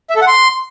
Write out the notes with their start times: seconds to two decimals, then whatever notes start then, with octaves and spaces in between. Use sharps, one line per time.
0.10 E5
0.16 A4
0.21 F#5
0.27 C6